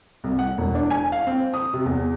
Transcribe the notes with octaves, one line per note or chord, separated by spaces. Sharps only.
C2
F#5
E1
D4
G#5
F5
C4
D#6
C3
E2